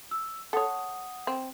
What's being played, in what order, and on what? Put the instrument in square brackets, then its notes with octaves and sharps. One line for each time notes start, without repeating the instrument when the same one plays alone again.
[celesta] E6
[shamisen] A4 C#5 [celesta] F#5 D#6
[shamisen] C4